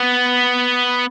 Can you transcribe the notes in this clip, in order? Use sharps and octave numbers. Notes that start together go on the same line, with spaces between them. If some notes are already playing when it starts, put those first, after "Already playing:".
Already playing: B3